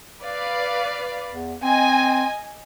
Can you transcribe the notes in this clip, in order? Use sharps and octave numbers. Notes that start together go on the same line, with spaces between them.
B4 D5 F5
E2
C4 D#5 G#5